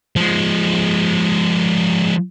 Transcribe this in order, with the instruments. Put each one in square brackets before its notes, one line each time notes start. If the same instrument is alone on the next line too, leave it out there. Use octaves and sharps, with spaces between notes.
[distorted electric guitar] F3 G#3